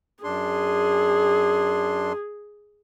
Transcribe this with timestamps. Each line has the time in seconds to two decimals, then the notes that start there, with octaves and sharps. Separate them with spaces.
0.24 F#2 D4 G#4 C6